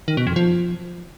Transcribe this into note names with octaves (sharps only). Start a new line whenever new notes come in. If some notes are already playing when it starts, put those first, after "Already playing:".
D#3
B2
F2
F3